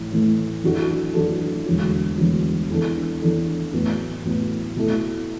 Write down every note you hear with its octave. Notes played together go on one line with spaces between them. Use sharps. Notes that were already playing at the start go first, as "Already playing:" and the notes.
Already playing: A2 E3
A2 E3 A3
F#2 E3 D4 F#4 A4
F#2 E3 D4 F#4 A4
E1 E2 D3 F#3
E1 E2 D3 F#3
E2 E3 D4 A4
E2 E3 D4 A4
A1 A2 F#3 B3
A1 A2 F#3 B3
B2 A3 E4 A4